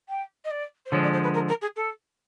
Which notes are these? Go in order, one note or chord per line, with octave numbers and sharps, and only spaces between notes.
G5
D#5
D5
C5
D3 F3 G#3 C#5
D5
C5
B4
A#4
A#4
G#4
A4